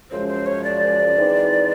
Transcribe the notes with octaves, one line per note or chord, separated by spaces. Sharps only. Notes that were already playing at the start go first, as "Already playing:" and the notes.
F#2 C#3 F3 G#3 C#4 C5
C5
C#5
D5
E3 G#3 C4 D#4